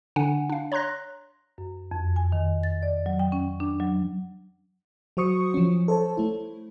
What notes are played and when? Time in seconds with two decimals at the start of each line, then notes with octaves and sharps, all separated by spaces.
0.16 D3 D4 F#5 G#5
0.49 D4 F5
0.72 C#5 A#5 C6 F#6 A#6
1.58 F#2
1.91 F2
2.16 G#5
2.32 D#3
2.63 A6
2.83 D5
3.06 F#3
3.19 G5
3.32 C#4
3.60 D4
3.80 F#3
5.17 F#3 F#4 C5 C#6 D#6 C#7
5.54 F3 C#4
5.88 A4 C5 C#5 A5
6.17 A3 E4